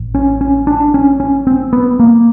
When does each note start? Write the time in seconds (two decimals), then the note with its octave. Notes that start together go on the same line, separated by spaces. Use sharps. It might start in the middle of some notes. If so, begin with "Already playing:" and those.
Already playing: A1
0.15 C#4
0.41 C#4
0.67 D4
0.94 C#4
1.20 C#4
1.47 C4
1.73 B3
2.00 A#3